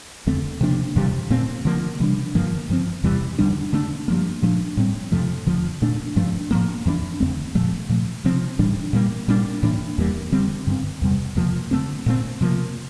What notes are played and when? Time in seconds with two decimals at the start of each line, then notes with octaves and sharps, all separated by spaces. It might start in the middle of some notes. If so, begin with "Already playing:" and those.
0.26 E2 D3 A3 C4
0.61 C3 F3 A#3 D4
0.96 F2 C3 E3 G3
1.30 A#2 A3 C4
1.65 D3 F3 A#3
2.00 C3 E3 G3 D4
2.35 G2 D3 F3 A#3
2.70 G2 F3 C4
3.04 E2 C3 E3 G3
3.39 E2 D3 G3 D4
3.73 D3 A3 D4
4.08 G2 F3 A#3
4.42 A#2 F3 A3 D4
4.77 A2 G3 C4
5.12 F2 C3 F3 A3
5.47 F2 D3 F3
5.82 A#2 A3 D4
6.16 G2 F3 A3 D4
6.51 A2 F3 A#3
6.86 F2 E3 A#3 D4
7.20 F2 D3 A3 C4
7.55 A#2 F3 A3
7.89 A#2 F3 A3
8.24 C3 F3 C4
8.59 A2 E3 G3 D4
8.93 A#2 G3 A#3
9.28 A#2 G3 A#3 D4
9.63 A2 E3 A#3 D4
9.98 E2 E3 G3 A#3
10.32 D3 G3 C4
10.67 G2 D3 A3 C4
11.02 E2 C3 G3
11.36 F2 C3 F3 A#3
11.71 D3 A3 C4
12.06 A#2 A3 C4
12.41 C3 F3 A#3